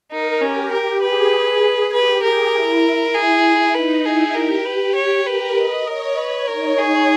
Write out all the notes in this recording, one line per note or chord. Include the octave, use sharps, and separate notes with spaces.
D#4 A#4
C#4 G4
A#4
G#4 B4
G4 B4
G#4 A#4
E4
E4 G#4
D#4 B4
E4 G#4
G4 A#4
G4 B4
C#5
A#4 B4
D#5
A#4 C#5
B4
D#4 A#4
G#4